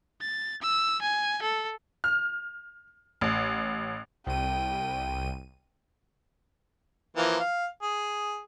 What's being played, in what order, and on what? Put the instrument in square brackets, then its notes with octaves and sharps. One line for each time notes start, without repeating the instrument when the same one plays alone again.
[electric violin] A6
E6
G#5
A4
[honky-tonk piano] F6
A1
[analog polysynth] C2 D#7 [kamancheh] G5
[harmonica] E3 F3 A#3
F5
G#4